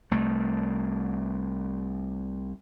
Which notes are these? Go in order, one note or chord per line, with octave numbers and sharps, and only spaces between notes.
C2 A3